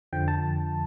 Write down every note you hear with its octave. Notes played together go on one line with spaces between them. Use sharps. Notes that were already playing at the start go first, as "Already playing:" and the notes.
F2 D3 F3 G5
A5